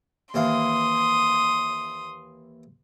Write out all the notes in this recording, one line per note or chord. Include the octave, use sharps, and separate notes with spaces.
D#2 E3 F5 C6 D#6